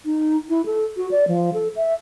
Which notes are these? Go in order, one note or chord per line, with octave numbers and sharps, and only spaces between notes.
D#4
E4
A4
F#4
D5
F3
A4
E5